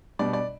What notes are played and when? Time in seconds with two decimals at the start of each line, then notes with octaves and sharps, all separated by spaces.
0.19 B2 G3 D4 D5
0.33 D5